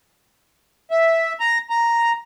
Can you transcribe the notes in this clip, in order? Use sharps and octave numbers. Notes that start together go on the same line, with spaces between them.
E5
A#5
A#5